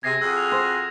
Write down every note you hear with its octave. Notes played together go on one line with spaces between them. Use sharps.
C3 G#4 G#6 A#6 C7
F2 F#4 G#4 E6
F7
C5